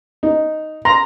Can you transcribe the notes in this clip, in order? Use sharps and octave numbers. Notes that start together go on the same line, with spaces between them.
D#4
A#5 C6